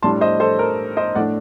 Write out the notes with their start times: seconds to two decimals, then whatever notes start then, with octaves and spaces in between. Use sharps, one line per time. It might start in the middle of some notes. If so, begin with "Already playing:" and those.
0.03 A2 G3 D4 A5 C6
0.21 C5 D#5
0.40 A4 C5
0.59 A#4
0.97 C5 D#5
1.15 A2 A3 D4 D5 F#5